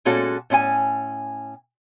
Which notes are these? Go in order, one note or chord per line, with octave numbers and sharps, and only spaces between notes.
A#2 G#3 C#4 F#4 A4
A2 C#4 E4 G#5